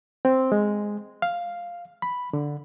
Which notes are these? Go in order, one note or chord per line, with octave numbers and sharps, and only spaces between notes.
C4
G#3
F5
B5
D3